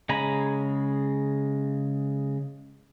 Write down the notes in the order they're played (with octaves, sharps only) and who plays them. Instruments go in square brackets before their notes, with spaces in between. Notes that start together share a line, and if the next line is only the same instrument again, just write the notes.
[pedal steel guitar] C#3 G#3 G#5 A#5 B5